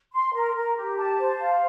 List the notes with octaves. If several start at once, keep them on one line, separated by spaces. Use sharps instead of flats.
C6
A#4
A#4
G4
A5
C5
F5